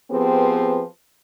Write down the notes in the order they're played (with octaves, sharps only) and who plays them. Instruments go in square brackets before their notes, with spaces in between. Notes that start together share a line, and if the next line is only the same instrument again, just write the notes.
[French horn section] F3 B3 C4 G4 G#4 B4